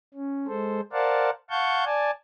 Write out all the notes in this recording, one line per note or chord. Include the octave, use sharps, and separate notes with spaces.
C#4
G#3 A4 C5
A#4 C5 D5 F5 F#5 A5
F5 F#5 A5 C#6 G6
D5 G#5 A5